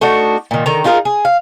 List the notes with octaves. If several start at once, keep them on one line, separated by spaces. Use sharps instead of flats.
A3 D4 D#4 F#4
A#2 D#3
D3 D#3 A#5
D#4 F4 G#4 A#4
G#4
F5